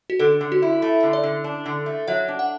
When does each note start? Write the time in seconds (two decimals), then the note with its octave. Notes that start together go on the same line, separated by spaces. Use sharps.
0.10 F#4
0.19 D3 A4
0.41 D3
0.52 F#4
0.62 E4
0.82 A3
1.03 D3
1.13 D5
1.23 D3
1.44 D4
1.66 D3
1.86 A3
2.08 F#3 E5
2.28 D4
2.39 F#5